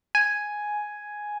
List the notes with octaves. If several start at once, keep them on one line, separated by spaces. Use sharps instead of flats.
G#5